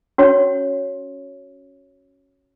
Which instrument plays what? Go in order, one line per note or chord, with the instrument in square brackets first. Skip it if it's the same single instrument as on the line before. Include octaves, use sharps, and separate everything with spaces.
[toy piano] C#4 F#4 C#5